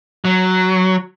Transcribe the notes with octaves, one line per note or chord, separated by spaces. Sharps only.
F#3